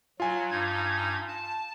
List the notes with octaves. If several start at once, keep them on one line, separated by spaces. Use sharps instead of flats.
F#3 F4 G#5
G2 D#4 G#6
A5